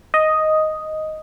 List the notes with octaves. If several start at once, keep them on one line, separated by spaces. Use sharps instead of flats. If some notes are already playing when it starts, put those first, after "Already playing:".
D#5